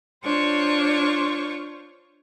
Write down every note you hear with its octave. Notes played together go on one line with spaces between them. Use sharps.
D4 F4 C5 C#5 C#6